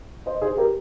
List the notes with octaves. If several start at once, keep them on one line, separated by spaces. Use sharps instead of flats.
C5 D#5
G#4 C5
G4 A#4